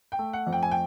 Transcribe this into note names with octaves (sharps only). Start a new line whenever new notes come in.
G5
A3
F#5
F2
G5
G#5
G5